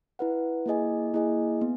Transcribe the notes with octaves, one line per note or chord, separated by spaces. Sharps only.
E4 B4 F#5
A#3 E4 G#4 D#5 G#5
A#3 E4 G#4 D#5 G#5
B3